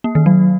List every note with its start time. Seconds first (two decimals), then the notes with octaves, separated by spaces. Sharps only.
0.04 A#3
0.15 D#3
0.26 F#3